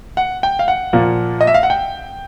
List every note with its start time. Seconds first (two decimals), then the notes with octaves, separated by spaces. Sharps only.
0.17 F#5
0.43 G5
0.59 F5
0.68 F#5
0.93 A#2 F3 A#3
1.41 D#5
1.47 E5
1.54 F5
1.63 F#5
1.70 G5